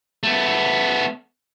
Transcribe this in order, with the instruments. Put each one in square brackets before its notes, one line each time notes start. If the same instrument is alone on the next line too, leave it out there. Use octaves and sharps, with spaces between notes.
[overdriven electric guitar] A3 B3